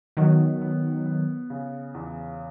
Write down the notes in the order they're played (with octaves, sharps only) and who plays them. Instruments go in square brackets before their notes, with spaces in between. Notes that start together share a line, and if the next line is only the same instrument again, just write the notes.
[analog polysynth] D#3 F#3 [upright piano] B3
[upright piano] B3
B3
C#3
E2